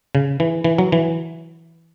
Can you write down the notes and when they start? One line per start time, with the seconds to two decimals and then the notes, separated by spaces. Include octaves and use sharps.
0.15 C#3
0.40 E3
0.64 E3
0.78 F#3
0.92 E3